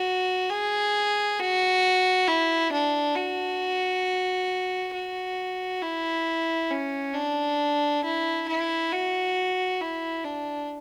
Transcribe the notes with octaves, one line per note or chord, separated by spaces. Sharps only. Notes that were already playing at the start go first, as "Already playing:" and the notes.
Already playing: F#4
G#4
F#4
E4
D4
F#4
F#4
E4
C#4
D4
E4
E4
F#4
E4
D4